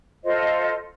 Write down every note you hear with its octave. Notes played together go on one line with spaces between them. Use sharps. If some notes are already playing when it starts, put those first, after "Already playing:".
F4 A4 C5 D#5